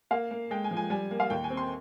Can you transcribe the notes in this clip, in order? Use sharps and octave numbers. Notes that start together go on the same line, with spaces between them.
A#3 F5
A#3
G#3 G5
G#5
F3
G#5
G3 G#5
A#3
F5
D#2 G5
G#5
C4
C6